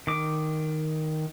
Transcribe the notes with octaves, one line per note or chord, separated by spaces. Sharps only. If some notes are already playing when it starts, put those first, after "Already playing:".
D#3 D6